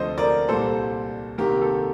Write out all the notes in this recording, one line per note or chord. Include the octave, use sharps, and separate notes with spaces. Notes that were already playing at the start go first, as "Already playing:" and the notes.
Already playing: D2 C3 F3 A3 C5 D#5
A#4 D5
C2 A#2 G3 A4 C5
C2 C3 D#3 A#3 G4 A#4
A4